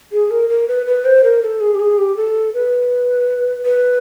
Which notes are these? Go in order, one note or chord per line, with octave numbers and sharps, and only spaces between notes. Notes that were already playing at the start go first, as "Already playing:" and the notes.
G#4
A#4
A#4
B4
B4
C5
A#4
A4
G#4
G4
G#4
G4
A4
B4
B4